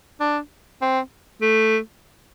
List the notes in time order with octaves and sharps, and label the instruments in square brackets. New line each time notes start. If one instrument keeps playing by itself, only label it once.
[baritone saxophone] D4
C4
A3